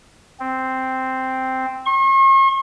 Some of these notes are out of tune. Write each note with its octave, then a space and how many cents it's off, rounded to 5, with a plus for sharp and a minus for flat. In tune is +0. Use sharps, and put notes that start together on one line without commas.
C4 -5
C#6 -45